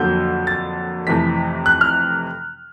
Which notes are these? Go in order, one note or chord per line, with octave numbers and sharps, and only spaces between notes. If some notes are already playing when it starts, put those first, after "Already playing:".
Already playing: F2 D3 F#3 A#3 G6
A6
F2 C3 E3 A3 B6
F#6
F6